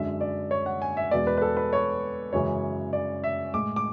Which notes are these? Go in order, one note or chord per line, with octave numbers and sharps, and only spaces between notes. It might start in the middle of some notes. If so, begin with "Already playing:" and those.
Already playing: F#2 D3 G#3 E5
D5
C#5
F#5
G#5
E5
E2 B2 G#3 D5
B4
B4
A4
B4
C#5
F#2 C#3 E3 G#3 C#5
D5
E5
A2 G#3 D6
D6